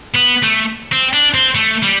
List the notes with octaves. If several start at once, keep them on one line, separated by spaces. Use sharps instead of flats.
B3
A3
C4
D4
C4
A3
G3